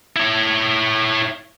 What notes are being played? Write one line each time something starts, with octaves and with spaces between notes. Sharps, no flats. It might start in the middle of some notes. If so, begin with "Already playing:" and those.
E4 C#5